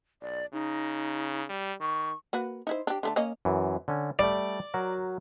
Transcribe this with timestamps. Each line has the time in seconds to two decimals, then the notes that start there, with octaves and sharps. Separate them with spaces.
0.21 B1 D5
0.53 C#3 D#4
1.50 G3
1.81 D#3 C#6
2.33 A#3 F#4 B4
2.67 D#4 E4 C5
2.87 D4 G4
3.03 D3 A3 A5
3.16 A#3 C#4 D#5
3.45 F#2 E3
3.88 D3 C#4
4.19 G3 A3 D5
4.74 F#3 F#4 A#4